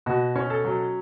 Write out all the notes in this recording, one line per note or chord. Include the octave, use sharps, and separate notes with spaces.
B2 F#4
C#4
A4
F#3